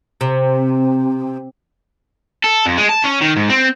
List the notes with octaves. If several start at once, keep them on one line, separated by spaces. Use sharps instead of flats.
C3
A4
F2
G#3
A5
C#4
D#3
G#2
C4